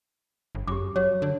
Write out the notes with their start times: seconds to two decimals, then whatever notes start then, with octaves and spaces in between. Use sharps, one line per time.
0.55 G1
0.67 F#2 G4 D6
0.96 F#3 C#5
1.22 D3